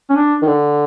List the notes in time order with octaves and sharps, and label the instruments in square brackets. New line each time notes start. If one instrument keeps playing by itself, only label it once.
[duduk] C#4
D4
[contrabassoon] D#3
D3